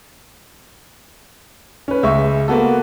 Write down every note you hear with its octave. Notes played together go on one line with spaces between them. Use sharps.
C#4 B4
C#2 E5 C#6
A#3 B3 F#4 A4